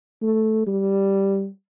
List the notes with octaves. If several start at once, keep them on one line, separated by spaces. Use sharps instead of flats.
A3
G3